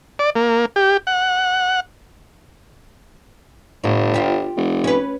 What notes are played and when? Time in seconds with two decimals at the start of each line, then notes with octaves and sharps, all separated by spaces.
0.19 D5
0.36 A#3
0.76 G4
1.07 F#5
3.84 G1 A2
4.14 F4 G4
4.57 F1
4.84 C#4 B4